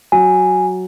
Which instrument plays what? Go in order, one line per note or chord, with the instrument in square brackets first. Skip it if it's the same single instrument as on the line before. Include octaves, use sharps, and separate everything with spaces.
[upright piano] F#3 [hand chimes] G#5